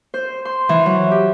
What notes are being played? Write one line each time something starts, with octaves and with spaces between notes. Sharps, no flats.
C5
C6
E3
F#3
G4